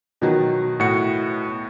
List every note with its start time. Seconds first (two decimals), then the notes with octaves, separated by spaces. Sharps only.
0.21 B2 D#3 F#3
0.80 A2 F#4 C#7